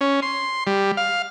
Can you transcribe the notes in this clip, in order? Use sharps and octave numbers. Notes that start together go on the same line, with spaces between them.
C#4
C6
G3
F5